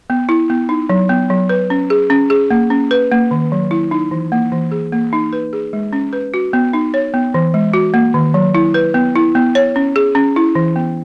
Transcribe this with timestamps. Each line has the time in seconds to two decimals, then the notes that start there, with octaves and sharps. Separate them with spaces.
0.10 B3
0.29 E4
0.50 B3
0.69 D#4
0.90 F#3
1.09 B3
1.30 F#3
1.49 B4
1.70 C#4
1.90 G#4
2.10 C#4
2.30 G#4
2.51 A#3
2.70 C#4
2.91 B4
3.12 A#3
3.31 D#3
3.52 F#3
3.71 E4
3.91 D#4
4.11 E3
4.32 A#3
4.52 E3
4.72 G#4
4.92 A#3
5.13 D#4
5.33 B4
5.53 G#4
5.73 G#3
5.93 C#4
6.13 B4
6.34 F#4
6.53 B3
6.73 D#4
6.94 C#5
7.14 B3
7.34 E3
7.54 G#3
7.74 F#4
7.94 A#3
8.14 D#3
8.34 F#3
8.55 E4
8.74 B4
8.94 B3
9.15 E4
9.35 B3
9.55 C#5
9.76 C#4
9.96 G#4
10.15 C#4
10.36 E4
10.55 E3
10.76 B3